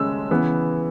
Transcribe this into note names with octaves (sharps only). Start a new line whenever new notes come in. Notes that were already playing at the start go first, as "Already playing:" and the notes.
Already playing: C#3 G#3 C#4 E6
C#3 E3 B3